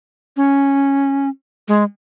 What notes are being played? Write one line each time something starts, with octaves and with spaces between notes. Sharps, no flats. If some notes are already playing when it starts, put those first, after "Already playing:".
C#4
G#3